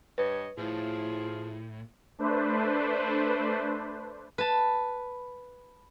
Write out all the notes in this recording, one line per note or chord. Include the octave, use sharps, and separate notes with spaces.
G2 B4 C#5 D#5
A2 F3 E4 F4 G#4
A3 D4 B4 C5
B4 A5